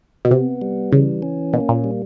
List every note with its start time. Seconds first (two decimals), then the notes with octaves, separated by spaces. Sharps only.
0.25 B2
0.31 C3 B3
0.62 G3
0.92 C#3 E3
1.22 C#4
1.53 B2 A#3
1.69 A#2
1.84 G3